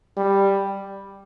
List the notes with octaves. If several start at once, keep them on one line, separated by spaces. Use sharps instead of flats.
G3